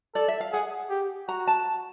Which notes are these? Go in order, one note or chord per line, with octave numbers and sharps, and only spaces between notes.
A4 D5
E5
F5
G#4 F#5
G4
F#4 A#5
A5